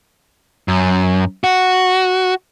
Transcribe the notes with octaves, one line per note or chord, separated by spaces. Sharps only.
F#2
F#4